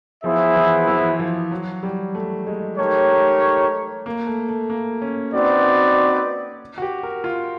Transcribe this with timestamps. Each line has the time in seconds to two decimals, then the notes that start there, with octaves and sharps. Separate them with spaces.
0.24 F3 B3 E4 G#4 C5 E5
0.56 E3
0.88 E3
1.19 F3
1.51 F#3
1.83 G3
2.15 A3
2.47 G#3
2.78 A3 D#4 G4 A#4 C#5
3.11 A3
4.06 A#3
4.27 A3
4.48 A3
4.70 A#3
5.02 C#4
5.33 C4 D#4 F#4 B4 D5
6.78 F#4
6.82 G4
7.03 A#4
7.24 F4